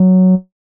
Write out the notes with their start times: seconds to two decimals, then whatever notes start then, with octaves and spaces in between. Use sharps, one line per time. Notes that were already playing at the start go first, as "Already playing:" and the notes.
Already playing: F#3